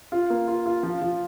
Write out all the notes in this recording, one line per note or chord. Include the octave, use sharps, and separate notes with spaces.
F4
A#3
F4
F4
F3
F3